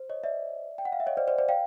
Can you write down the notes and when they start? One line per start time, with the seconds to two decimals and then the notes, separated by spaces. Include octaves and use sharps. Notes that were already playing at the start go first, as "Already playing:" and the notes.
Already playing: C5
0.10 C#5 D#5
0.24 D5 E5
0.78 G5
0.85 F#5
0.92 F5
1.00 E5
1.07 C#5 D#5
1.17 C5 D5
1.27 C5 D5
1.38 C5 D5
1.49 F5 G5